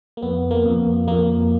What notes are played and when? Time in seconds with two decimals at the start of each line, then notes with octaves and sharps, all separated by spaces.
0.17 A#3
0.22 F2 B3
0.51 A#3
0.65 F2
1.08 F2 A#3